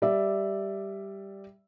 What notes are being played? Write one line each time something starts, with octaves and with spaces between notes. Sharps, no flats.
G3 D5 E5